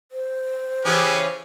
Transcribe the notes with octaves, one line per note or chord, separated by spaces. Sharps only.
C5
C#3 E3 C#4 G4 G#4 B4